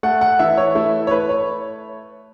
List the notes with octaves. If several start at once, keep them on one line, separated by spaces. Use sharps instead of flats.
A3 F#5
F#5
E3 E5
C#5
A3 E4
C#5
A3 B4
C#5